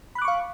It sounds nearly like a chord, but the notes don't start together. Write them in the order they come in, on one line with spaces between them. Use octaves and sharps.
B5 F#6 D6 C#6 F5